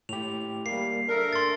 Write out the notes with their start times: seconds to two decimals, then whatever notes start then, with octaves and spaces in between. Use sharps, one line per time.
0.09 A2 G4 F7
0.66 G3 A#3 C7
1.08 D4 A4 A#4 E5
1.33 C6 A6